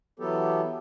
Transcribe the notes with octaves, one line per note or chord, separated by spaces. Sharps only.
E3 F#3 B3 G4 A4